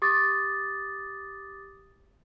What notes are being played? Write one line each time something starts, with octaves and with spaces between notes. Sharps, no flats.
G4 D6 D#6 A6